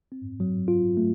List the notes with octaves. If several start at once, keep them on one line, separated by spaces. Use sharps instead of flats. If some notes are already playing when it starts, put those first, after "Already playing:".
C4
F#3
F4
A3